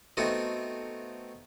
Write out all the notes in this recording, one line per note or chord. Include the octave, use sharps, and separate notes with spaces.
A3 B3 C4 D#4 F#4